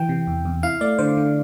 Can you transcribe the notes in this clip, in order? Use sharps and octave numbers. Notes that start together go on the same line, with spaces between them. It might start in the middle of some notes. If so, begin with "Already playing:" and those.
Already playing: E3 G5
C3
E2
E2
E4 F5
A3 D5
D3 C5
D3